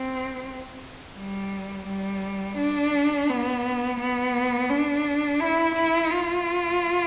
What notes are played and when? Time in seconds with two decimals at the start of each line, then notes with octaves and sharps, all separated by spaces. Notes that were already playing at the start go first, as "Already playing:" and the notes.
Already playing: C4
1.17 G3
1.88 G3
2.58 D4
3.29 B3
4.00 B3
4.70 D4
5.41 E4
5.75 E4
6.11 F4